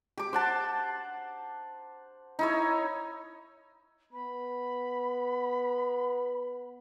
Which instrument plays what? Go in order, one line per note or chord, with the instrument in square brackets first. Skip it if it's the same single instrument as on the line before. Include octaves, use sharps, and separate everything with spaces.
[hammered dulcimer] G4 D6
C5 F#5 A5
D#4 E4 C#5
[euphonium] B3 [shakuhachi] B5